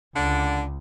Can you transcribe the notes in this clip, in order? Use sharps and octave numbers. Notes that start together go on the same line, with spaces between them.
C#2 D3 D5 F#5